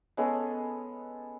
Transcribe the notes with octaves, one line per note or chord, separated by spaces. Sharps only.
G#3 B3 C#4 A4